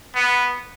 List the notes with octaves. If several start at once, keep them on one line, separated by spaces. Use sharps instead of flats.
B3